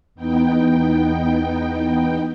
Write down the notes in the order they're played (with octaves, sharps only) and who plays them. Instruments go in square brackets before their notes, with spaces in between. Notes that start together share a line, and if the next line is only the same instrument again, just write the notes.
[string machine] E2 B3 D#4 G5